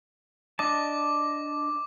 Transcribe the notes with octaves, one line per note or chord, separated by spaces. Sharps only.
D4 D#5 A5 D6